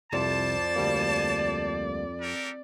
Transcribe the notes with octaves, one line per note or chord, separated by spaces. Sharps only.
C2 F2 C3 C5 D5 A5
D2 G3 A#3
G4 A4 A#4